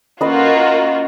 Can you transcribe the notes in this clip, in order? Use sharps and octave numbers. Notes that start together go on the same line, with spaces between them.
A#3 C#4 F4 F#4 B4 D#5